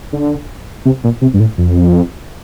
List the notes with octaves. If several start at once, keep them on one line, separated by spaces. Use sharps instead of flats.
D3
C3
A#2
C3
G2
A2
F2